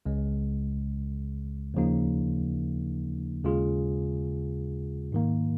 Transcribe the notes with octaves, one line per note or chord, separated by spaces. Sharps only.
C#2 C#3 G#3
D#2 C#3 F3 A#3 D#4
D#2 C#3 G#3 F4 G#4
G#2 D#3 A#3